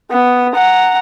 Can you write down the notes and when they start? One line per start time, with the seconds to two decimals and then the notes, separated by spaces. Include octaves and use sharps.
0.11 B3
0.54 F#5 A#5